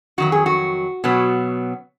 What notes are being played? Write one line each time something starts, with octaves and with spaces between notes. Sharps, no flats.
F2 D#3 F#3 F#4
G#4
F#4
B2 F#3 B3